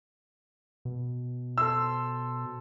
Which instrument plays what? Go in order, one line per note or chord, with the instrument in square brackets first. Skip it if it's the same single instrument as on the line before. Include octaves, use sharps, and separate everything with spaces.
[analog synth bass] B2
[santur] A4 C5 C6 [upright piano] E6